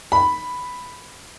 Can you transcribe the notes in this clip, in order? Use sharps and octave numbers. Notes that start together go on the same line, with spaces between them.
B5